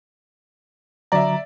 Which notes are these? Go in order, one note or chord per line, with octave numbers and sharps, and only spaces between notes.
D3 F#3 D5 E5 A#5